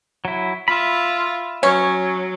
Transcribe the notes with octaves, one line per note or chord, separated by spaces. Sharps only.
F#3 E4
F4 E5 B5
F#3 C#4 C#5